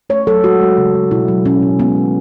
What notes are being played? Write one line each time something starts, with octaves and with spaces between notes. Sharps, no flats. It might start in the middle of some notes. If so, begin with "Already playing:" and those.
A3 C#5
F#3 A4
G#3 F#4
G#3
C#3
C#3
B2 E4
F#3
B2 C#4
F#3
G#3 B3
D#3